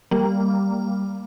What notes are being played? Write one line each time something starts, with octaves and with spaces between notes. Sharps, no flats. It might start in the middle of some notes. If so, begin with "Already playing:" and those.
G3 A#3